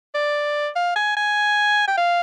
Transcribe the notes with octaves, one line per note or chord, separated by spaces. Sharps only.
D5
F5
G#5
G#5
G5
F5